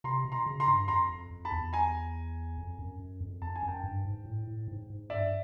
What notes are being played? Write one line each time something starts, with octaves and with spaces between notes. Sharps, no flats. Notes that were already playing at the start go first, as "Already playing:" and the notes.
C3 A#5 C6
B2
A#5 C6
C#3
A#5 C6
G2
F2 A#5 C6
F2
F2
A5 B5
E2
G#5 A#5
F2
F#2
F#2
F2
F2 A5
G#5
F#2
G5 A5
G2
G#2
A2
A2
G#2
G#2
G2 D5 E5